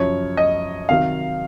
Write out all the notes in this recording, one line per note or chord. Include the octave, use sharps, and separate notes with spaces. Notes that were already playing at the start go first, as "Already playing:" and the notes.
Already playing: F#2 C#3 F3 C#5
D#5
C3 D#3 F#3 F5